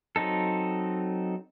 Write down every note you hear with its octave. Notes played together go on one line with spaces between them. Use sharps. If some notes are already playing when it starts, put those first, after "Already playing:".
F#3 C4 D#4 A4